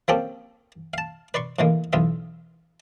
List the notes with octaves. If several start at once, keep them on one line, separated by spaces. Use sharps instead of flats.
F3 A#3 C4 C#4 G4 A4
F5 A5
B4 D5 C6 C#6
A2 C#3 E3 G#3 A#3
B1 E2 F4 E5